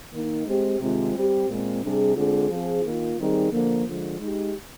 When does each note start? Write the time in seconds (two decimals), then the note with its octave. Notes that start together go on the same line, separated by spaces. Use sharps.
0.12 D#3 A#3 D#4
0.46 G#3 C4 G4
0.80 C3 D#3 G#3 C4 F4
1.14 G3 C4 G4
1.48 A#2 G#3 C4
1.82 C3 G3 D4 G#4
2.16 D3 G#3 C4 F4 G#4
2.49 F3 C4 F4 G#4
2.83 D#3 A#3 F4
3.18 D#3 G3 C4 D#4 G#4
3.51 D3 F3 A#3
3.85 D3 F3 G#3
4.19 G#3 D#4 G4